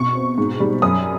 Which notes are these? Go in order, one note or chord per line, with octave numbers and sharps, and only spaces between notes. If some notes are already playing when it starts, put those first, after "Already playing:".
Already playing: B2 C#6
C4
G#2
G3
F#2 D#6